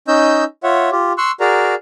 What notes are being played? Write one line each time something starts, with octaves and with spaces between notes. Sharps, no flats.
C#4 D#4 D#5 E6 G6
F4 C#5 E5 F#5
F4 G4
C6 C#6 E6 F#6
F#4 G#4 A#4 D5 A#5